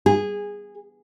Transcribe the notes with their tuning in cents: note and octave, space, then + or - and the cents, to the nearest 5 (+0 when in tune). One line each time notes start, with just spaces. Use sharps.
G#4 -15